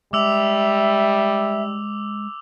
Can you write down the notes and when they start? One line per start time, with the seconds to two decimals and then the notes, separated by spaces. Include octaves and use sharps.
0.13 G3 G#3 E5 D6 E6 F7